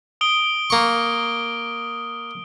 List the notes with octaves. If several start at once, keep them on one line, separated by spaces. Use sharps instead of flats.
D#6 D7 G7
A#3 C#6